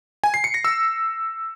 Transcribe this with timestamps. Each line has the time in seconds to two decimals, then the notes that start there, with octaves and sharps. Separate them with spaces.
0.24 G#5
0.34 C7
0.44 C#7
0.54 A#6
0.65 E6